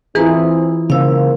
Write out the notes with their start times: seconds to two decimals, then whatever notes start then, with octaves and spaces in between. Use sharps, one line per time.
0.15 E3 C4 E4 F4 G#4 B4 A#5
0.90 C#3 G#3 A#3 C5 F5 E6